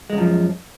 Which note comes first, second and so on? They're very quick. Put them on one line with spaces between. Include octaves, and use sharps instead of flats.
G#3 F#2 F3